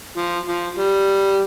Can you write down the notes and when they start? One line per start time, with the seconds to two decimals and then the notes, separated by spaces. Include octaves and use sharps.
0.17 F3
0.47 F3
0.77 G3